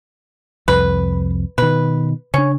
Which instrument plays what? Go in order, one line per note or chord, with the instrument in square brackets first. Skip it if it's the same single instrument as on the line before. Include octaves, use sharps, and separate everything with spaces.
[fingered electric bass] C2 F2 [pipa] B4
[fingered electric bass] B2 D#3 [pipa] B4
[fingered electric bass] C#3 D4 [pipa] C#4